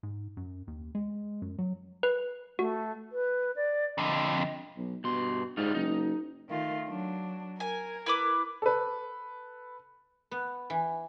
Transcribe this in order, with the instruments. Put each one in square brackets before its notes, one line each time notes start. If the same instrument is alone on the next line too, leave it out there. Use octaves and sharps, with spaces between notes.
[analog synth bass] G#2
F#2
D#2
G#3
F#2
F#3
[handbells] B4
[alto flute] A3 [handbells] F#4
[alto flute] B4
D5
[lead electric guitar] F2 D3 [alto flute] D#5
[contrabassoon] B1
[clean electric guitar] G2 C6 [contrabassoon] B2
[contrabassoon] G#2 [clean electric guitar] G3 D#4 F4
[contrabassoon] F#1 [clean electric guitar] D#4
[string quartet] D#3 A3 F4
F#3 D4
[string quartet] A#4 [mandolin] G#5
[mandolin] E4 B4 D6
[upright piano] A4 B4
[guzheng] B3
E3